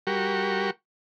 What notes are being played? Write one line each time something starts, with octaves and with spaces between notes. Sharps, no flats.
G3 F#4 G4 A#4 C#6